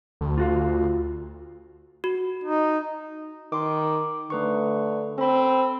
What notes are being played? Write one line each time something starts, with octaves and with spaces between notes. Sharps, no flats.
D2
F4 F#4 F5
F#4
D#4
D#3 C6 D6
D3 A3 B4 C#6
C4 A4 B5